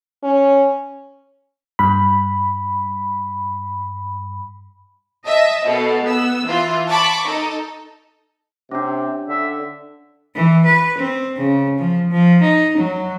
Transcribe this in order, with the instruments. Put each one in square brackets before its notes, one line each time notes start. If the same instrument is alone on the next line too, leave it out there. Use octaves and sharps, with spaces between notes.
[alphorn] C#4
[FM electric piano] G2 B5
[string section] D#5 E5 A5
B2 A4
B3 E6
E3 F4
A5 B5 C#6 D6
D#4 A4
[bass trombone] C3 [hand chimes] C#4 D4
[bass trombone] D3 [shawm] E5
[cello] E3
B4
C4
C#3
F3
F3
D#4
F#3